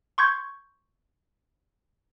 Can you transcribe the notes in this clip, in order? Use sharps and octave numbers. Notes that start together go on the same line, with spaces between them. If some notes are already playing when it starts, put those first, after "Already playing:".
C6 C#6 G6 G#6